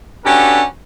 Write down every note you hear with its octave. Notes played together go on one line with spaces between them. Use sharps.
C#4 D4 F#4 G4 A4 B4